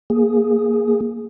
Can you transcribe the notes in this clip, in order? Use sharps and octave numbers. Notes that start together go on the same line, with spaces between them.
A#3 G#4